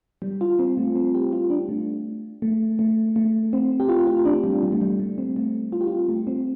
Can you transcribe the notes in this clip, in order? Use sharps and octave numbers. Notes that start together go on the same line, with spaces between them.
G3
F4
C4
A3
C4
G4
F4
D4
A3
A3
A3
A3
C4
G4
F4
F4
D4
G3
G3
A3
G3
A3
C4
A3
F4
G4
F4
A3
C4